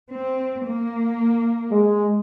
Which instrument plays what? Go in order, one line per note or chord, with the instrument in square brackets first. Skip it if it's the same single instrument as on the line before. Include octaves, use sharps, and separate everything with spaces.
[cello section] C4
A#3
[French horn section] G#3